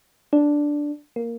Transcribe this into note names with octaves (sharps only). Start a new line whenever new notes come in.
D4
A#3